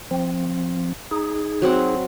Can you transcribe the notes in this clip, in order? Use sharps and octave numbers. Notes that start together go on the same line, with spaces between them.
F3 C4
D#4 G#4
F#3 C4 F#5